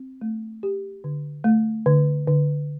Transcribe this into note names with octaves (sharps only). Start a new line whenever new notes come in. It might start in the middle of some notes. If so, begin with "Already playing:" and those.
Already playing: C4
A3
G4
D3
A3
D3
D3